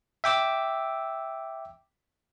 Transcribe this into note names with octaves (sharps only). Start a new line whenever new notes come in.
E5 G5 D6 E6